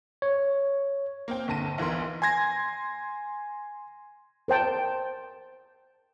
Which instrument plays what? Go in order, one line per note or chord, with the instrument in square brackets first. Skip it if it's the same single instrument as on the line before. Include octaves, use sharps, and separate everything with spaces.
[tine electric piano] C#5
[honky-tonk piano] A#3 C4 G5
G1 D3 A5 A#6 D#7
B1 E3 B3 A#4 C6
[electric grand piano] G#5 C6 G#6 A#6
[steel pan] A#4 C5 G5 A5